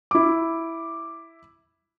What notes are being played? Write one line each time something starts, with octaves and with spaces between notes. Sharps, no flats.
E4 D6